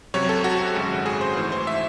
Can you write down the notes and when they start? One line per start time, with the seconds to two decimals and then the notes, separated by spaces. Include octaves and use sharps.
0.14 C#2 C3 F#3 C#5
0.29 A4
0.44 F#4
0.75 G#1 F#2 C#3 G#3
1.06 G#4
1.21 C5
1.37 G#2 E3 A3 C5
1.52 C5
1.67 E5